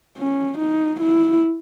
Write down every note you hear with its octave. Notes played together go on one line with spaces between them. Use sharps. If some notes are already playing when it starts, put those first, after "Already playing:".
C#4
D#4
E4